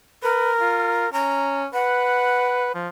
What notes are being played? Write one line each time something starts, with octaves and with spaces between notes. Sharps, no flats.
A#4 B4
F4
C#4 A#5
B4 F#5
F3